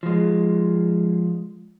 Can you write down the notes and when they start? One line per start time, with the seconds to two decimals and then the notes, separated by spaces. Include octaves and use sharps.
0.03 F3 G#3